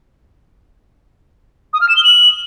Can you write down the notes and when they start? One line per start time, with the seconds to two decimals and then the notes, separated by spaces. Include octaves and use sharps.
1.73 D#6
1.81 F6
1.89 E7
1.96 G7
2.04 F#7